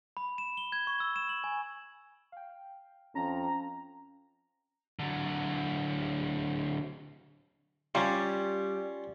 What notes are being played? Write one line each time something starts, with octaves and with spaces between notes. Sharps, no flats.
B5
E7
G7
G#6
C#6
E6
E7
F#7
G#5
F5 G5
F2 C#4 A5 A#5
D3 F#3
G3 C#4 F4